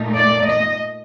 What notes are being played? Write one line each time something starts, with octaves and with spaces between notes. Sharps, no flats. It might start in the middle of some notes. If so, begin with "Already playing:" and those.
Already playing: A#2 A3 D#4
D5
D#5